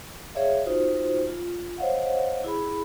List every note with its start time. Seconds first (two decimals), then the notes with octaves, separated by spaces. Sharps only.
0.35 G#4 C#5 D5 E5 F5
0.65 D#4 F4 F#4 C5
1.27 F4
1.78 C5 C#5 D#5 F5 F#5
2.44 E4 G#4 B5